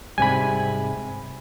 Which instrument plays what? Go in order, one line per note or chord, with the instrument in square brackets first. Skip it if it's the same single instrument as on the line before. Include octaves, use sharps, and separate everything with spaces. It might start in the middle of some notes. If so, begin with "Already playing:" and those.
[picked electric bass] G#2 C3 G3 [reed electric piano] G#5 B5